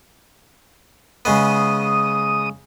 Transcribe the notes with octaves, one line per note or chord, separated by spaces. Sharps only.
C#3 G#3 B3 D#6